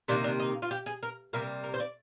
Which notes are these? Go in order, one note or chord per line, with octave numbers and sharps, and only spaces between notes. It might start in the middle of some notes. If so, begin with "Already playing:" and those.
C3 D#3 A#3 D4
D4
D#4
F4
G4
G#4
A#4
C3 G3 A#3 A#4
A#4
C5
D5